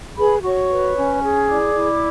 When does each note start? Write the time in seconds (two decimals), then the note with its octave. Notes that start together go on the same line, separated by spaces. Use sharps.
0.17 G#4 B4 B5
0.43 F#4 C#5 C#6
0.70 B4
0.96 C#4
1.23 G#4
1.48 E4 D5 D6
1.74 E4